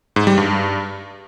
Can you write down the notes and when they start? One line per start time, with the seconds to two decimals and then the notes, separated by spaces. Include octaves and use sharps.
0.16 G#2
0.27 G3
0.38 G2